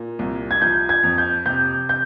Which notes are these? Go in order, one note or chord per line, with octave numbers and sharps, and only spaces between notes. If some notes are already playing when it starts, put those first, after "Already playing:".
Already playing: A#2
C2
G#6
F3 G6
G#6
F2
G6
C3 G6
G6